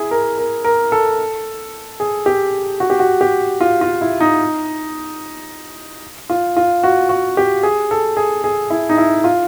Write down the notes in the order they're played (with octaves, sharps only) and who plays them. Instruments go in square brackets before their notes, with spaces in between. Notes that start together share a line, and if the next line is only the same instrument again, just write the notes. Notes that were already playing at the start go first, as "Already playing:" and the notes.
Already playing: [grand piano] E4 G#4
A#4
A#4
A#4
A4
G#4
G4
F#4
G4
F#4
G4
F4
F4
E4
D#4
F4
F4
F#4
F#4
G4
G#4
A4
G#4
G#4
E4
D#4
E4
F4